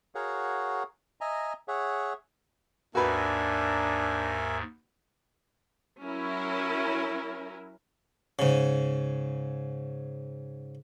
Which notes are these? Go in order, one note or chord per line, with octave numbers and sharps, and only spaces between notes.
F#4 G#4 A#4 C#5 F5 F#5
D#5 E5 G#5 A#5
G#4 C#5 E5 F#5
D#2 G#2 D4 F#4 A#4 B4 E5 G#5
F#3 C#4 E4 A#4
G#2 C#3